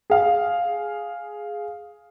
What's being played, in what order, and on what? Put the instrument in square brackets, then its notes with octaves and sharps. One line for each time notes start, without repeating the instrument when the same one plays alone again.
[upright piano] G#4 F5